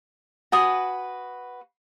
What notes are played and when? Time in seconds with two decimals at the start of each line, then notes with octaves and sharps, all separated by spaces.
0.52 F#4 B4 G#5 D#6